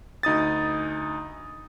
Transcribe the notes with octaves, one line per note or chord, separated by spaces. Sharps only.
D2 D#4 D#6 A6